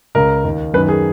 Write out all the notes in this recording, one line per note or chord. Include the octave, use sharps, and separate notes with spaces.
C#2 C#3 A#4
D#2 D#3
F#2 D#3 B4
G#4